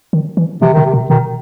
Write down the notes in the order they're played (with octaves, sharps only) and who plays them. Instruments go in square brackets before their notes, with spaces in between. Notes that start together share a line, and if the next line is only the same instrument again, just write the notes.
[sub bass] D#3
E3
[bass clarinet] C3 [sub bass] E3
[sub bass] C3 [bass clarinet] D#3
[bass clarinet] C3
[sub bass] B2
[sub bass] B2 [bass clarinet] D#3